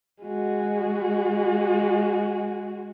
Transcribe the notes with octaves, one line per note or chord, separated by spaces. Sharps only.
G#3 F#4